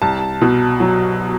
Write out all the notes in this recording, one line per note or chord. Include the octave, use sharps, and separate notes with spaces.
C2 A5
B2
F#3